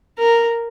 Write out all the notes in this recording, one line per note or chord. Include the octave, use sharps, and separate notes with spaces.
A#4